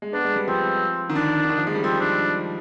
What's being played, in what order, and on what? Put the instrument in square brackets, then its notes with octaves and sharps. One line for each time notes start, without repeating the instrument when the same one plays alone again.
[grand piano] G#3
[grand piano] B3 [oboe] D4
[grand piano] G#3
G3
[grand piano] F3 [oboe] C4
[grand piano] D#3
[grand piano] D3 [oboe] D4
[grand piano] D3
D#3
F3
G#3
G3
[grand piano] F3 [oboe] C4
[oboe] D4